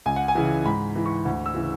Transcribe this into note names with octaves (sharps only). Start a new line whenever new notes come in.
C#2 G#5
F#5
G#5
C#3 E3
G#2 B5
E3
C#6
D2
E6
C#3 E3